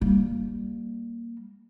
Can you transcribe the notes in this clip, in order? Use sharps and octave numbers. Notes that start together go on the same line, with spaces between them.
G3 A#3